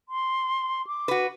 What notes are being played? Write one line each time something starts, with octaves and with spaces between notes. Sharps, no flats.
C6
D6
F#4 B4